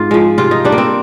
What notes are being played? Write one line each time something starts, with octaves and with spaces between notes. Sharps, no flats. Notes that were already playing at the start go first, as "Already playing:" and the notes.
Already playing: G#2 C4 F4
F3 G#3
C3 F4
D#4
G3 D4
A#3
C4